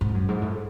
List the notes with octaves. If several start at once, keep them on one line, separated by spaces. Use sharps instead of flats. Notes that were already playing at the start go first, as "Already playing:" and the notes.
G#2
F#2
G#2
A2